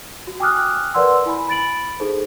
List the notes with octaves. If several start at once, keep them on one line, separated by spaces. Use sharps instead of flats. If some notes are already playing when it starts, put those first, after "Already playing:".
F#4
G5 G#5 D6 D#6 F6 F#6
A#4 B4 D5 F#5 C6 E6
E4 G#5 B5
B5 A6 D7 F#7
D#4 G#4 A4 C5